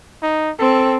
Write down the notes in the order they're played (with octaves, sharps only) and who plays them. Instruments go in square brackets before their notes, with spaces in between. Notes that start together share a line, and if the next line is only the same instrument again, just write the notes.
[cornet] D#4
[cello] C4 [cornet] A4